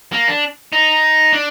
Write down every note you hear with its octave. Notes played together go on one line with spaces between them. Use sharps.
A#3
D4
D#4
D4